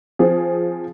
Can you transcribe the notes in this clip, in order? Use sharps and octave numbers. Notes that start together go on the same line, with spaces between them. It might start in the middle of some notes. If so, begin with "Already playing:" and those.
F3 C4 G#4